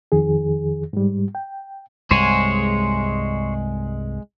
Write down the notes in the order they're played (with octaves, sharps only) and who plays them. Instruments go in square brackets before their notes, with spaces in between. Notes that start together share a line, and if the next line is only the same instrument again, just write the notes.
[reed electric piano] F2 D#3 G#4
G#2 G3
G5
[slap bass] C2 G2 [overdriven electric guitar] G#3 [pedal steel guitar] C5 C#5 G#5